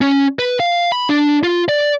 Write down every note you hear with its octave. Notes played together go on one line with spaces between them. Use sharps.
C#4
B4
F5
B5
D4
F4
D5